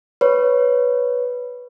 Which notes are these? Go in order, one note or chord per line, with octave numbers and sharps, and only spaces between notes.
B4 C#5